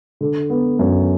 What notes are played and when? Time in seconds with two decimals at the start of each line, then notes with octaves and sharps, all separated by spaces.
0.21 D3
0.50 B3
0.79 F#2